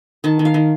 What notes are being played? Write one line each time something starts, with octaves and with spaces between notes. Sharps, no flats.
D#3 A5
D#3
F5
D#3